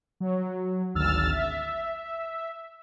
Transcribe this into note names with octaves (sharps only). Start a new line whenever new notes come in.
F#3
G#1 D2 E6 F6 A6
E5